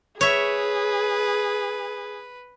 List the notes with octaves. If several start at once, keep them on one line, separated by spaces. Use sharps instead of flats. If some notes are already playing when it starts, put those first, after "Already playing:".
G#4 B4 C#5 E5